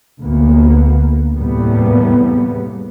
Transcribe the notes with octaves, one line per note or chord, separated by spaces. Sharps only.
D2 A#3 B3
E2 A2 C3 G3 A#3 B3